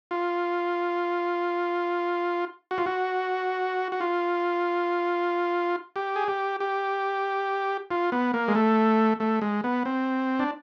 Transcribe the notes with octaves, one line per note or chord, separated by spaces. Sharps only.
F4
F#4
F4
F#4
F#4
F4
G4
G#4
G4
G4
F4
B3
A#3
G#3
A3
A3
G#3
B3
C4
D4